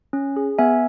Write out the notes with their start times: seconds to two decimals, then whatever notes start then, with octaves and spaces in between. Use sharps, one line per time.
0.13 C#4
0.36 G#4
0.59 B3 E5 G#5